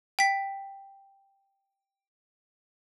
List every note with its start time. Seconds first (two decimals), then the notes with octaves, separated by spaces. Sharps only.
0.19 G5 B6